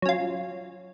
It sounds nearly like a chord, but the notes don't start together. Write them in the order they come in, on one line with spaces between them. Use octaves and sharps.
F#3 C#4 F4